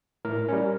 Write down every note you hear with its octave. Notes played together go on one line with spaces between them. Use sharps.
A2 A#4
G3 C#4